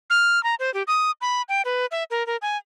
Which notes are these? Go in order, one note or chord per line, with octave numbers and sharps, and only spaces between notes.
F6
A#5
C5
G4
D#6
B5
G5
B4
E5
A#4
A#4
G#5